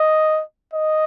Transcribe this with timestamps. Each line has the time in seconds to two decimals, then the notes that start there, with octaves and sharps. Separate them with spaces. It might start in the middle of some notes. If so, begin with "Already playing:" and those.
Already playing: D#5
0.74 D#5